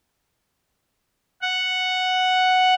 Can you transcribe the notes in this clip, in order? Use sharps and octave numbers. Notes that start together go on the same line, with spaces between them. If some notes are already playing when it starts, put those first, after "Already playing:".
F#5